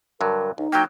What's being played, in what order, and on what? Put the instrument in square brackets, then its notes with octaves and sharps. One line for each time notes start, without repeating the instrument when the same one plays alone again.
[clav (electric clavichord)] G2 D3 F#3 [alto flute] A#4
[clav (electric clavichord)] C#2 [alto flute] D#4
[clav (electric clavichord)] F#3 A#3 [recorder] G5